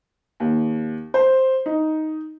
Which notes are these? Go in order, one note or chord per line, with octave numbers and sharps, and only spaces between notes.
D#2
C5
D#4